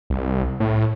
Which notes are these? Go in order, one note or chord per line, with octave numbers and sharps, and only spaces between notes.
C2
A2